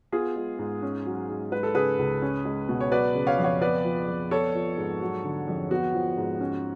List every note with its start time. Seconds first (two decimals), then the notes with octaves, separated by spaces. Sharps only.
0.12 B3 F4 G#4
0.36 G#3
0.59 G#2
0.82 C#4
1.06 F#3
1.29 G#2
1.52 G#3 B4
1.63 A4
1.75 C#3 G#4 B4
1.99 C#2
2.22 C#4
2.45 G#3
2.69 B2
2.81 C#5
2.92 F#3 B4 D5
3.15 C#3
3.27 C#5 F5
3.38 F2
3.44 C#5 F5
3.62 B3 B4 D5
3.84 F3
4.08 F2
4.31 B3 A4 C#5
4.55 F3
4.78 G#2
5.01 F#3
5.24 D3
5.48 F2
5.71 B3 F#4
5.94 F3
6.17 G#2
6.41 C#4